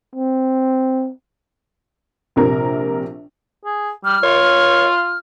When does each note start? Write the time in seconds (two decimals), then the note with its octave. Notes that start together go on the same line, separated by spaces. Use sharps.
0.15 C4
2.36 A#1 C3 A#4
3.65 G#4
4.04 G3 F6
4.23 F4 C#5